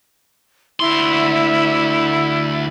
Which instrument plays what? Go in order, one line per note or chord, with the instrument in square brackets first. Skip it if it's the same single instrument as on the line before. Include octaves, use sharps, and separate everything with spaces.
[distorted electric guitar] D2 C6 [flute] E4